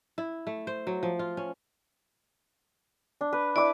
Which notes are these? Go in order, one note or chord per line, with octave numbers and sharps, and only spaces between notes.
E4
A3
C5
F#3
F3
F4
C#4
D4
B4
E4 D5 D6